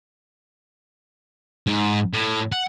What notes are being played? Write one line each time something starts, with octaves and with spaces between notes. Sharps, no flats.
G#2
A2
F#5